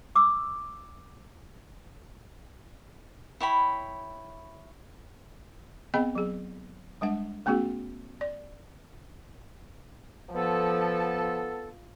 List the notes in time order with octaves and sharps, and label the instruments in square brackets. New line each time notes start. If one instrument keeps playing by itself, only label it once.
[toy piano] D6 E6
[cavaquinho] E4 C#5 G5 B5
[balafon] B3 C4 G#4 D#5 F#5 B5
F#3 G#4
G3 G#3 D4 F#5
A3 B3 C#4 F#4 G#4
D5
[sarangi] F3 [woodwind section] B3 A4